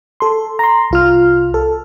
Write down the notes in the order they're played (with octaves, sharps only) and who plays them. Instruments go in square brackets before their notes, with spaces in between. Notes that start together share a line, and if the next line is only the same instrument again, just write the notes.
[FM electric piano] A4 C6
A#5 C6
C2 F4 F6
A4